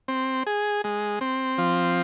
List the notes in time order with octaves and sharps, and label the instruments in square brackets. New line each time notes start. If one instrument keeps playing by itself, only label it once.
[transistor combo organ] C4
G#4
G#3
C4
F3